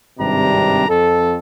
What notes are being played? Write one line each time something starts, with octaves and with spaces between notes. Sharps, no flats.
G#1 G2 C3 G3 D4 A#5
F2 A4